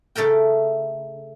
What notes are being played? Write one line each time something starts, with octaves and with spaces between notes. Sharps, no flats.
C#3 A3 A4 A#4 G5